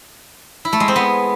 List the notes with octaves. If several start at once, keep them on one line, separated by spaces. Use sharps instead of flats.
E4
A3
G#3
C4
B3